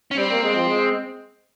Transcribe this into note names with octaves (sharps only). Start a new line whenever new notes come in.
C#4
G3 C4
A#3
G#3
F3
G#3